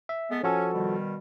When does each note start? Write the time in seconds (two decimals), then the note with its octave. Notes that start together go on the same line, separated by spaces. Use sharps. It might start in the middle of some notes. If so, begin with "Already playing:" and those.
0.09 E5
0.31 G#3 B3 A4
0.44 F3 C#4 F#4 A4
0.73 B2 D#3 G3